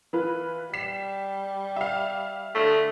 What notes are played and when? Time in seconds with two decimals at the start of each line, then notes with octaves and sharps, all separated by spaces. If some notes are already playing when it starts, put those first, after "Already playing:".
0.13 E3 F4 B4
0.74 G3 B6 C7 E7
1.76 E5 F5
2.55 D3 A3